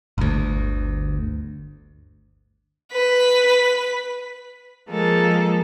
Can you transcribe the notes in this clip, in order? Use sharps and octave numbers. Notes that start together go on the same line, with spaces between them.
G1 D2
B4 B6
F3 G#3 A#3 A4